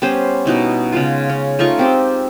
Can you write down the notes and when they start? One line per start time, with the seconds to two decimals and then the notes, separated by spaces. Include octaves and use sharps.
0.02 G3 B3 C#4 C5
0.46 B2 D#4 E4
0.93 C#3 G#3 F4
1.30 C#4
1.59 A3 D#4 F4 C#6
1.77 G#3 C4 G4